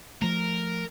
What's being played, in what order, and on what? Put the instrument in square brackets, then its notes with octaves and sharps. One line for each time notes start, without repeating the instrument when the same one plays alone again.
[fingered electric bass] F3 A3 [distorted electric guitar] A#4